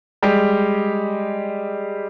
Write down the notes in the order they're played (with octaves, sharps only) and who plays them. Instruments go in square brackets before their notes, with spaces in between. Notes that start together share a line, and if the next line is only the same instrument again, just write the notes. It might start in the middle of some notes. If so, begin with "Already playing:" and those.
[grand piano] G3 G#3 G4